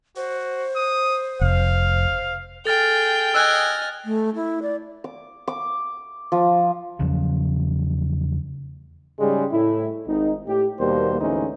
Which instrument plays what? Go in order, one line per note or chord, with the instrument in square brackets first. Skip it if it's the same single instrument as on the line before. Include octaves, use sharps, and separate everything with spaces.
[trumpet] F#4 [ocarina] C5
[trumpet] D#6
[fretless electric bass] F1 [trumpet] F5
[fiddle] G#4 G5 [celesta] A4 [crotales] F6 A6 F7
[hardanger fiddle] D#5 G#5 [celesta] E6 F#6
[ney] A3
E4
D5
[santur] D6
D6
F3
[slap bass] E2 C#3 F3 F#3
[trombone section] G#2 C#3 G3 G#3
A2 E4
G#1 D#4
A2 G4
D#2 B2 G3 A#3 C5
D2 G#2 E3 C#4 D#4